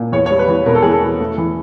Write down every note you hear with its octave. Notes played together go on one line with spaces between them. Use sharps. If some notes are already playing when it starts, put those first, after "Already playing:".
Already playing: A#2
E2 C#5
C#5
G3
B4
E2
B2 A#4
A4
E2 G#4
A4
E2
A3
E3